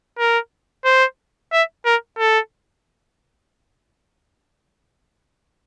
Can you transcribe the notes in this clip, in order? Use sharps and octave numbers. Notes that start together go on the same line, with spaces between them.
A#4
C5
E5
A#4
A4